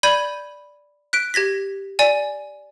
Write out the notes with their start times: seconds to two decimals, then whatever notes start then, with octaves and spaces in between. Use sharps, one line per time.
0.03 D5 B5 G6 G#6 D#7 F#7
1.13 F#6 B6 D7
1.34 G4 G#6 A#6 B6
1.99 D5 G#5